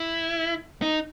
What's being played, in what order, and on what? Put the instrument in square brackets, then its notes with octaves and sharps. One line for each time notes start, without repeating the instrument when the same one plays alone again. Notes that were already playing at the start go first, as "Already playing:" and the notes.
Already playing: [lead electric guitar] E4
D#4